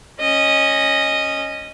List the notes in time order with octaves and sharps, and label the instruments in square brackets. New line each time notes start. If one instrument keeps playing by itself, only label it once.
[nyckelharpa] C#4 D#5